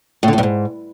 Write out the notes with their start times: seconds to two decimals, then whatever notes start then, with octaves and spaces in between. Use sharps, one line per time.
0.23 A2
0.28 D3
0.33 A2
0.38 G2
0.43 G#2